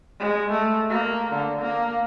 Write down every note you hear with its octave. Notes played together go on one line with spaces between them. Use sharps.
G#3
A3
A#3
D3
A#3